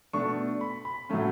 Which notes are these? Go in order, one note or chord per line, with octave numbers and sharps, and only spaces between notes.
B2 A3 D4 C#6
B5
B5
A2 F#3 A3 C#4